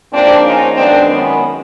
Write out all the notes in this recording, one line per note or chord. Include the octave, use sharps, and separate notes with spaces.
G#2 F3 A#3 C4 D4
C#4 D#4
F#2 D#3 G#3 B3 C4 D4
B3 C#4